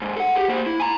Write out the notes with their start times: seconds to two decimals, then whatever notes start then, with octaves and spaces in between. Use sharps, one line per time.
0.02 D#2 G#2
0.17 A4 F#5
0.35 G4 G#4
0.49 A#3 C5
0.66 E4
0.80 G#5 A#5